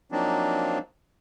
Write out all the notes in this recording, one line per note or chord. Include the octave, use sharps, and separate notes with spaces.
F3 F#3 A#3 C4 D4 D#4